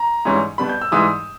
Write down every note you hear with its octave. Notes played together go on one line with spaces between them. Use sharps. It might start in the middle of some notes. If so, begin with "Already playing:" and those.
Already playing: A#5
G#2 E3 G3 C#4
B2 G3 B3 B5
G6
E6
G#2 E3 G3 D#6